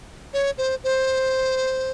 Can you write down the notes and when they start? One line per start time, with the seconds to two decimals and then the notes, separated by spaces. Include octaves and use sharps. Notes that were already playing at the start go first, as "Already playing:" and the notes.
0.33 C#5
0.58 C5
0.84 C5